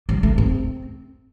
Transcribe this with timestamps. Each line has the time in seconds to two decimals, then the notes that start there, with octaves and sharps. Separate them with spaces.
0.09 G3
0.23 A3
0.38 C4